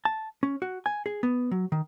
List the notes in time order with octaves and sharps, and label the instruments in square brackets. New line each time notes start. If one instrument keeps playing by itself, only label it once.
[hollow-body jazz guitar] A5
C#4
F#4
G#5
G#4
B3
F#3
D#3